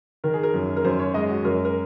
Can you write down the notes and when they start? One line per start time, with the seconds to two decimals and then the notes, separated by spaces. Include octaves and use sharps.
0.24 D#3 A#4
0.33 G#4
0.43 A#4
0.54 F#2
0.77 A#4
0.85 F#2 C5
0.99 C#5
1.14 G#3 D#5
1.29 F#4
1.44 F#2 A#4
1.65 A#4